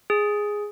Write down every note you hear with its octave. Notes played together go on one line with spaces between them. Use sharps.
G#4